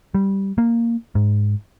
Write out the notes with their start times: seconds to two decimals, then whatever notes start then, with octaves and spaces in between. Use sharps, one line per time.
0.14 G3
0.58 A#3
1.15 G#2